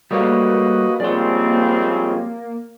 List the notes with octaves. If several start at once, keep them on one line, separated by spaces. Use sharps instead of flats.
G3 A3 A#3 F#4 B4 C#5 D#5
G#1 F3 G3 G#3 C4 C#4 D5 C6